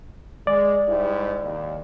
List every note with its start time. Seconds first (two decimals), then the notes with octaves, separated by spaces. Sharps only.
0.47 G#3 D5
0.88 G#2 G3 E4
1.42 D#2